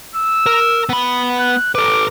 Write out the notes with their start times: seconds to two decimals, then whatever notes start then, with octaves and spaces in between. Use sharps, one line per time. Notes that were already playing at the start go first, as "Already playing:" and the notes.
0.15 E6
0.46 A#4
0.89 B3 B5
1.39 F#6
1.75 A4 B4 D6